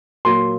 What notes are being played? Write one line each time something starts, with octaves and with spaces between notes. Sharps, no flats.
A#2 F#3 A#3 C6